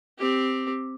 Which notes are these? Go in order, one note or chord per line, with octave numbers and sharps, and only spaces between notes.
C4 G4